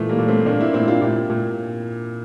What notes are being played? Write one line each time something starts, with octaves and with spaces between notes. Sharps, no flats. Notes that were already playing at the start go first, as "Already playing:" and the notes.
Already playing: A#2 E3 A3
G3 A#3
A#2
A3 C4
A#2 A#3 D4
C4 E4
A#2 C4 E4
D4 F4
A#2 E4 G4
A#2